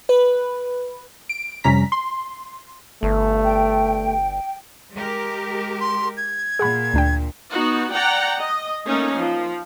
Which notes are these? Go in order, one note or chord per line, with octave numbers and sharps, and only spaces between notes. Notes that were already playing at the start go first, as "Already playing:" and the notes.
B4
D7
F2 C3 G3 C#4 A#5 B6
C6
G1 A3
G5
G#3 G4 A#4
C6
G#6
A#2 G#4 F#5 B5
D2 D4 G5
B3 D#4 F#4
D5 F#5 G5 A#5
D#5
A3 A#3 C#4 D#4
F3